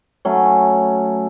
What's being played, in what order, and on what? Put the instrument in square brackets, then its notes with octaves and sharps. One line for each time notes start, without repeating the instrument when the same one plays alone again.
[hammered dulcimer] F#3 A3 C#4